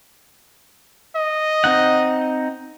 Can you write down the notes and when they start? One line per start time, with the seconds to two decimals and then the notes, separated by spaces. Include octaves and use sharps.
1.16 D#5
1.64 C4 D#4 F#5